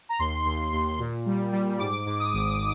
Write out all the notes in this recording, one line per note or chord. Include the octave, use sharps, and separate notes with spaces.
A#5
D#2 C6
D#2
D#2
A#2
G3
G3
G#2 D6
G#2
D#6
G#1